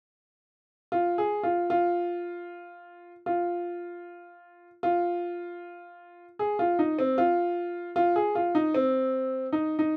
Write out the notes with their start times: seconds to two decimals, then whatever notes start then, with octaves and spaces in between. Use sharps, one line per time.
0.92 F4
1.18 G#4
1.43 F4
1.70 F4
3.26 F4
4.83 F4
6.39 G#4
6.59 F4
6.79 D#4
6.99 C4
7.18 F4
7.96 F4
8.16 G#4
8.35 F4
8.55 D#4
8.74 C4
9.52 D#4
9.79 D#4